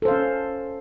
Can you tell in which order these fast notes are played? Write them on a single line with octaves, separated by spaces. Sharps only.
A4 C5 F5 C#4